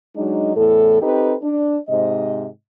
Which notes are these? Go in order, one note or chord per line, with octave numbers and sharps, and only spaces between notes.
F#3 G#3 D4 D#4
E2 A2 A4
C4 D#4 G4 A4 B4
D4
G#2 C3 D#5